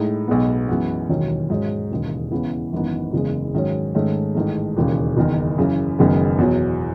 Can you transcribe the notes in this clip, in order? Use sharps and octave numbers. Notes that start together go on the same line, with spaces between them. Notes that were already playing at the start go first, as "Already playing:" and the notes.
Already playing: A2 G#3 D#4
B1 B2 G#3 B3
F#2 E3 G#3 B3
E1 D#2 D#3 F#3 C#4
G#2 F#3 C#4
E1 D#2 C#3
E2 C#3 E3 B3 E4
G#1 F#2 E3 B3 D#4
F#1 E2 C#3 G#3
G#2 D#3 F#3 C#4
G#2 D#3 A3 C#4
A1 G#2 D#3 A3
E1 D#2 C#3
F#1 E2 D#3
F#2 C#3 E3
F#1 F#2 D#3 G#3 B3
E2 B2 F#3